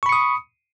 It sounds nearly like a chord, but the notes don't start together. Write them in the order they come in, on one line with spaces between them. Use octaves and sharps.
C#6 B5 C#7 D#6